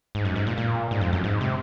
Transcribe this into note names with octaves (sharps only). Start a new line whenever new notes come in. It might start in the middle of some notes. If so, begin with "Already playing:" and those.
G#2
F#2
G#2
A#2
A#2
G#2
F2
F#2
G#2
C3